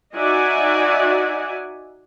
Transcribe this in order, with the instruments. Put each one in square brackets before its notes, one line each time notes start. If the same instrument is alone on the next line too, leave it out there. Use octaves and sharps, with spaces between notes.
[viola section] D#4 F#4 D5 E5 F#5 G#5